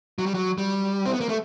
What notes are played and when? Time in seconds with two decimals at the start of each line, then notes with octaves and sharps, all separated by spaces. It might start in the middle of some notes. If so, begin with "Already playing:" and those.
0.19 F#3
0.26 G3
0.34 F#3
0.58 G3
1.06 C4
1.14 B3
1.20 A#3
1.29 A3